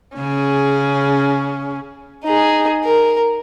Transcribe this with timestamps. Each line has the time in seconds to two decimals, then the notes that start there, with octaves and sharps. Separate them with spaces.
0.17 C#3 C#4 G#4
2.24 D#4 G#4
2.84 A#4